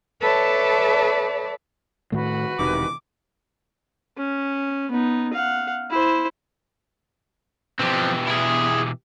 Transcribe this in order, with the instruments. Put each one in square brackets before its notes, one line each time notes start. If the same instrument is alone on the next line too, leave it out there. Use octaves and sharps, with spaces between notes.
[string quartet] A4 B4 C#5 D5 E5 A5
[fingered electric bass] A2 D#3 A3 [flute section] F#4 B4
[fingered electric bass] E1 [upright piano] C3 D#3 E3 [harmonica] D6
[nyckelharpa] C#4
B3 D#4
F5 F#5
E4 C5
[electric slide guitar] B2 E3 G4 [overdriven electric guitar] F3 C4
[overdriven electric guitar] E4 G#4